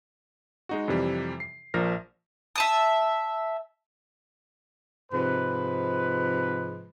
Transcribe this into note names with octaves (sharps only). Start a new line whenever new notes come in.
G#3 D#4 F#4
F2 C3 E3 G3
C7
A#1 F3 A#4 F6 A#6
E5 A5 D#6
G#2 C3 F3 G#3 B4